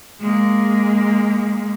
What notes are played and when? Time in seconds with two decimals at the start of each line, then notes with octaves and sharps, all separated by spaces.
0.20 G#3 A#3